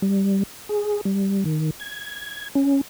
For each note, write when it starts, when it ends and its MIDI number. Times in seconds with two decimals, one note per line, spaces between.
0.02 0.43 55
0.69 1.01 68
1.05 1.44 55
1.45 1.70 51
1.80 2.48 92
2.55 2.81 61